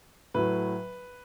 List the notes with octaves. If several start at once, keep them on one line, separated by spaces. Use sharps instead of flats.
A2 F#3 B4